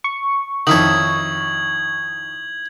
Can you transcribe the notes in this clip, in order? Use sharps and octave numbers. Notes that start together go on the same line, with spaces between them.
C#6
F2 D#3 D#4 E4 C#5 G#6 F#7